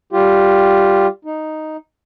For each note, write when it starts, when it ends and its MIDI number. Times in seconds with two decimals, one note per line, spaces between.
0.13 1.07 55
0.13 1.07 65
0.13 1.07 67
1.25 1.77 63